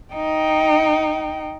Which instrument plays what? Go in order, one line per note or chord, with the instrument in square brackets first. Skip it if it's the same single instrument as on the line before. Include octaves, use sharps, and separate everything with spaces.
[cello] D#4 [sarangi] G5